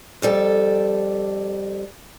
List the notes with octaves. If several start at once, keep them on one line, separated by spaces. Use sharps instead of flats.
F2 G3 A4